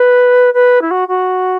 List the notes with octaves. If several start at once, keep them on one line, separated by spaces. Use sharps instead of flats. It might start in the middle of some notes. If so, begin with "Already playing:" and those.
Already playing: B4
B4
E4
F#4
F#4